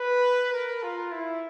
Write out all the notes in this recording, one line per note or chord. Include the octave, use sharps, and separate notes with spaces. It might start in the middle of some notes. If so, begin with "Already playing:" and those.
Already playing: B4
A#4
F4
E4